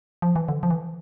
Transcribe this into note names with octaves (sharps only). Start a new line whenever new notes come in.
F3
E3
D3
F3
E3